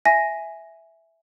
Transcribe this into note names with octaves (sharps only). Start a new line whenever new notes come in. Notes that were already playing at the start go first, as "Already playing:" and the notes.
E5 G#5 A#6